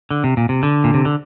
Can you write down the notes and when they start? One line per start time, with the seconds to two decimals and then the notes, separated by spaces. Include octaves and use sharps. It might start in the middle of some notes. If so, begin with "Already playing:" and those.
0.11 D3
0.24 C3
0.37 A#2
0.49 C3
0.63 D3
0.84 A#2
0.94 C3
1.05 D3